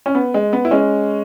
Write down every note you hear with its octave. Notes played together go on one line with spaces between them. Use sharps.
C#4
B3
G#3
B3
E4
G#3 C#4